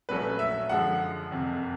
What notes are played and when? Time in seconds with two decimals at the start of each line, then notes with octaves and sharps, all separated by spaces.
0.09 A#1 A#2 F#3 A3 C#4 B4
0.39 E5
0.69 F#2 D3 F3 G#3 F#5
1.31 F#1 F2 C3